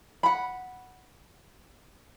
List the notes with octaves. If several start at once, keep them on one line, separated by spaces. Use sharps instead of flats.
F#5 B5